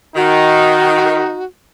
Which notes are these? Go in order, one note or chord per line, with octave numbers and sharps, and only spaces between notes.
D#3 D#4 F#4